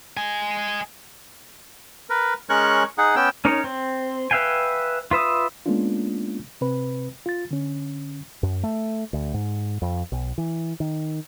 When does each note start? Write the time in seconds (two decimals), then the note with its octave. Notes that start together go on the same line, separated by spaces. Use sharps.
0.17 D#5 G#5
2.10 A#4 B4
2.50 G#3 C#4 A#4 C#5 C#6 F#6
2.98 D#4 G#4 F#5
3.16 B3 C#4 G5 E6
3.45 C#4 D#4 A#4 C#5
3.64 C4
4.31 B4 E5 F5 G5 G#5
5.11 F4 B4 E5 D#6
5.66 G#3 A#3 B3 C#4 D4 F4
6.61 C3 C4 B4
7.26 F4 A6
7.51 D3 C#4
8.43 F#2
8.63 A3
9.13 D2
9.34 G#2
9.82 F2
10.12 B1
10.38 E3
10.80 D#3